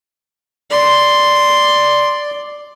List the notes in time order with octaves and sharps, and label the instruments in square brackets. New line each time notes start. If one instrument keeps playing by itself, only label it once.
[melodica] D5 [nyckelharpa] C6